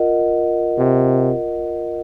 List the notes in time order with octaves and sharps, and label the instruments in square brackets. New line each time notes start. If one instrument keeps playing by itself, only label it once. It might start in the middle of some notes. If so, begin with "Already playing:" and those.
Already playing: [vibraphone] F4 A#4 D#5 F#5
[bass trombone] C3